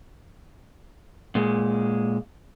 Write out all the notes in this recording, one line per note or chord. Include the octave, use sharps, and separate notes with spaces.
A#2 G#3